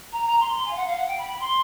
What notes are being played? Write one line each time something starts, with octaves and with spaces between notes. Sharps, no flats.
A#5
A#5
C6
C6
G#5
F5
F#5
F5
F#5
G5
B5
B5
C6